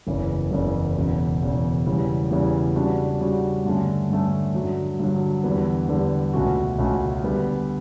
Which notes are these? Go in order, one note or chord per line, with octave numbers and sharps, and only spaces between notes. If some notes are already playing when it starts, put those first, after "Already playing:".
F#1 E2 C#3 E3
F#1 E2 C#3 E3
E1 E2 C#3
E1 E2 C#3
E2 C#3 E3 G3
E2 C#3 E3 G3
C#3 G3 D4 F#4
C#3 G3 D4 F#4
G2 D3 A3 C#4
G2 D3 A3 C#4
G2 D3 F#3
G2 D3 F#3
E2 D3 G3 B3
E2 D3 G3 B3
C#2 B2 A3 C#4 F#4
C#2 B2 A3 C#4 F#4
D3 G3 B3